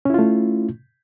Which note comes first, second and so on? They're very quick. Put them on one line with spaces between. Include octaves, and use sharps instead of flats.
C#4 E4 F4 A3